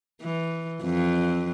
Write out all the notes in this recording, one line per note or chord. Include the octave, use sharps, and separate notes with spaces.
E3
F2